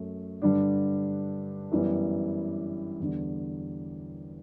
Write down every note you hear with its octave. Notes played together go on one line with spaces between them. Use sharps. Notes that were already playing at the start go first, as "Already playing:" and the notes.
Already playing: F#2 F#3 A3
G2 D3 G3 D4
F#2 E3 G3 B3
E2 D3 G3